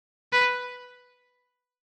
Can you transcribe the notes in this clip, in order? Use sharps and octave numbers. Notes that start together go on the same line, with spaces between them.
B4